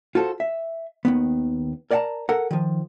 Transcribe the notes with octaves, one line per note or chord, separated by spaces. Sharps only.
F4 F#4 A4 C5
E5
D#2 D#3 B3
A#4 D5 D#5 F#5 A5 A#5
A4 A#4 F#5
D#3 F3